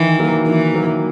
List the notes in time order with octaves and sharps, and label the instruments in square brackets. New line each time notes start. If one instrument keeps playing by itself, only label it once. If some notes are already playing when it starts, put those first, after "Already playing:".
Already playing: [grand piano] D#3 [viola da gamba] E3
[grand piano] F#3 A#3
[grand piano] D#3 [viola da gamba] E3
[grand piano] F#3 A#3